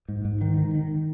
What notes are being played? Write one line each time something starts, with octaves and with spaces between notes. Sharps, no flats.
G#2
G#2
D#3
D#3
D#3